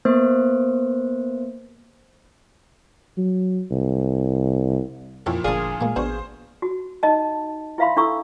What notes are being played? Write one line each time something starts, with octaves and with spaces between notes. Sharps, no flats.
A#3 B3 C5
F#3
C2
F2 A#2 F3 E4 G4 A4 C#5
G1 D2 A#2 F3 G#4 D5 F5 A5
A#2 G#3 A#3
A1 B2 D4 C5 C#6
F#4
D#4 D#5 A5
E4 B4 E5 F5 B5 C6
D4 E4 A4 C#6 E6